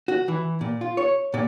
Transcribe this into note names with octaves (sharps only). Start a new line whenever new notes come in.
F#4
E3
A#2
F4
C#5
A#2